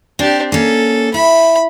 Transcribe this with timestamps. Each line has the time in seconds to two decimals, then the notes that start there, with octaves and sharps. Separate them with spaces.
0.19 C4 D4 G4
0.52 A#3 C#4 A4
1.14 E4 B5